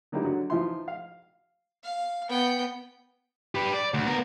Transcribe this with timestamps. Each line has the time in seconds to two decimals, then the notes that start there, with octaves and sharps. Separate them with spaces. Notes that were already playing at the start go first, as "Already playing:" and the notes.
0.12 D3 F#3 A#3 D#4 E4 G4
0.24 D3 F#3 F#4
0.50 E3 F3 D#4 E5 C6
0.88 F5
1.84 F5
2.29 B3 G5
3.55 G4 B4
3.73 D5
3.94 D2
4.06 B3 A#4